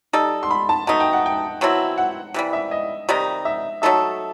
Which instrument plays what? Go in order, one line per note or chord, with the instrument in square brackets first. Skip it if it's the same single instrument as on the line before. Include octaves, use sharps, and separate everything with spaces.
[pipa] G3 D#4 A4
[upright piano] C6
B5
A5
[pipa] B2 A3 D#4 [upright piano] A5
[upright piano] G5
F#5
G5
[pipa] B2 F#3 C4 E4
[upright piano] F#5
[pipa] C3 E3 G3
[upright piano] E5
D#5
[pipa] C3 D#3 G3 D#4
[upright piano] E5
[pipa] F#3 A3 D#4 A4 [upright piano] E5